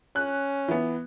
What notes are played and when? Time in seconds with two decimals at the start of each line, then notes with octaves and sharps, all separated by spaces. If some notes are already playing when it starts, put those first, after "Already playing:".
0.16 C#4 F#6
0.68 E3 B3